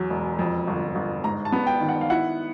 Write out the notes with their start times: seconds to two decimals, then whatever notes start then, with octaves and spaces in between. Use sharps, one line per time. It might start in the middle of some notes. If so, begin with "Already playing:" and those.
Already playing: E2 F#3
0.10 E1
0.39 F2
0.67 G1
0.95 G1
1.24 G#2 A#5
1.45 A5
1.52 B3
1.67 G5
1.81 D#3
1.89 F#5
2.01 F5
2.10 E4 F#5